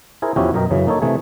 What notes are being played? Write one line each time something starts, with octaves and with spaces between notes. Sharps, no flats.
E4 G#4 A#4 C5
E2 F3 C#4 E4 F#4 G4
F#2 B2 A#4 D#5 G5
F#2 C#3 E3
A#3 D#4 A4 C#5
C3 E3 A3 G#4